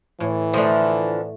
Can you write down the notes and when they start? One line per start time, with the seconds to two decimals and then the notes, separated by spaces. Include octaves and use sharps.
0.20 A2 E3
0.54 D3 F3 A3 C5 D#5